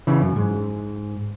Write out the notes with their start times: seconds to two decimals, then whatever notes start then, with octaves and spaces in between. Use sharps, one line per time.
0.07 C#3 E3
0.22 F#2
0.36 G#2